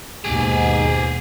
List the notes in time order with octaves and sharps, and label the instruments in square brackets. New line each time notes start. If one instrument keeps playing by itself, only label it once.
[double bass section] D#2 B2 [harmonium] G#2 [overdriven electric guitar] G4 G#4